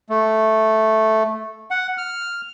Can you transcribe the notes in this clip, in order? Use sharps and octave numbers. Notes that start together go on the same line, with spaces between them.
A3
F#5
F6